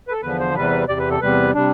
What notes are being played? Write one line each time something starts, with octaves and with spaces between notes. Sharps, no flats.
B4
A4
E2 D3 F3 B4
C5
E2 C3 G3 B4
E2 C3 G3 D5
B4
A4
E2 C3 G3 B4
C3 G3 D4